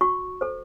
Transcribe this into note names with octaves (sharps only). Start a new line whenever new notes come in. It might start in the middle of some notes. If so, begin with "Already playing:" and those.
F#4 C#6
A4 C5